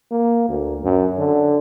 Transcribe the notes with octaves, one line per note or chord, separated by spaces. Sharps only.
A#3
D2
F#2
D3